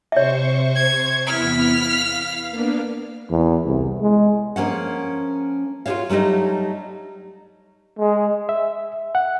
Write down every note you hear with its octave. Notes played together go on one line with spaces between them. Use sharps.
C3 C5 C#5 E5 C#6
G#6
E2 B3 E4 F6 B6
F5
A#3 B3 D4
E2
C2
G#3
F3 A#3 C#4 F#5
F4 F#4 G#4 C5 C#5 F5
F#3 G3 A3 D#4 D#5
G#3
E5
F#5